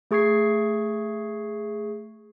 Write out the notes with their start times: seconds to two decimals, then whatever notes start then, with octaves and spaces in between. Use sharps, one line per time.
0.11 A3 G#4 C#6 G#6 C7